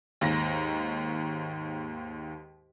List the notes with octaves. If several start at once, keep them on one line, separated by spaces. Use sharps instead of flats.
D#2 G#2 A#6